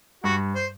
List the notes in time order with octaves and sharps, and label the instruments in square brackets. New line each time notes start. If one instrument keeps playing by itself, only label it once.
[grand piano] G2 [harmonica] F#4
[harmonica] C5